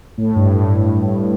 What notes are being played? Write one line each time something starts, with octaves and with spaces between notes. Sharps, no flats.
A2
G2
A2